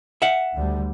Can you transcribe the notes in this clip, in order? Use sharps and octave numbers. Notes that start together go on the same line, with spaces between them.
E5 F#5
D2 D3 G3